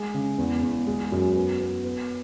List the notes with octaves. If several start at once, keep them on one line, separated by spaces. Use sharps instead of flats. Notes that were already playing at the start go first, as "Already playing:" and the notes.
Already playing: G#3
C#3
E2
E2
G#3
F#2
B3
B3
B3